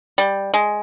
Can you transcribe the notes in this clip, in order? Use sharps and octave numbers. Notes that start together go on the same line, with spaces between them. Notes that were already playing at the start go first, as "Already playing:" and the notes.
G3
G#3